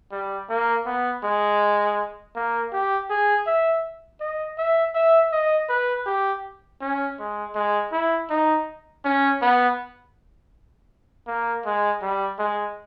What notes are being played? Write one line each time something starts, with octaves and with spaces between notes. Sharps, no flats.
G3
A#3
B3
G#3
A#3
G4
G#4
E5
D#5
E5
E5
D#5
B4
G4
C#4
G#3
G#3
E4
D#4
C#4
B3
A#3
G#3
G3
G#3